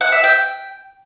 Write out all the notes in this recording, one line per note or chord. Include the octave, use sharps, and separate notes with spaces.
F#5
E5
G5